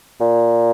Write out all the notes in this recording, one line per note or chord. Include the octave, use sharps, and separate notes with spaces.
A#2